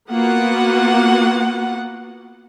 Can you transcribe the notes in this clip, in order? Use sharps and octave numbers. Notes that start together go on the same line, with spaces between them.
A#3 B3 F4 F#4 F#5